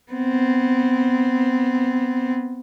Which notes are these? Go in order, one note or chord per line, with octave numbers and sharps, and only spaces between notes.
B3 C4